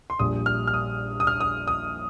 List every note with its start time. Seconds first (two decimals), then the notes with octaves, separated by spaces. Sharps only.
0.10 C6
0.19 A#1 A#2 G3 D#6
0.46 F6
0.67 F6
0.74 D#6
1.20 D#6
1.27 F6
1.40 D#6
1.67 D#6